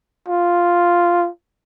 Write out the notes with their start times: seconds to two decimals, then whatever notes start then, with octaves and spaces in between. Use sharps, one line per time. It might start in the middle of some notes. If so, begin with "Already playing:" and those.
0.28 F4